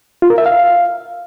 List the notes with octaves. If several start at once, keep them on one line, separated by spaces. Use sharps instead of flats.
F4
A#4
E5
F5